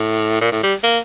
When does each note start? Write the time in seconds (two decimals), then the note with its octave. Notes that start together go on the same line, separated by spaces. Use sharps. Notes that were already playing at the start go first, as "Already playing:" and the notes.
Already playing: A2
0.41 A#2
0.52 A2
0.63 G3
0.83 A#3